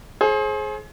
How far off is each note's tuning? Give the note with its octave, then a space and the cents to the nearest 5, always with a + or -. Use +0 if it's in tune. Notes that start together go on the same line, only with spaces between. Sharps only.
G#4 +30 C5 +35